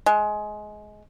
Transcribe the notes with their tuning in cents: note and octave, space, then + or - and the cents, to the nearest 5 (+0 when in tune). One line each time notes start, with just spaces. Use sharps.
G#3 +20